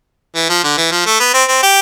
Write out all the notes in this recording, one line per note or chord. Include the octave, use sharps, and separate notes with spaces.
E3
F3
D3
E3
F3
A3
B3
C4
C4
G4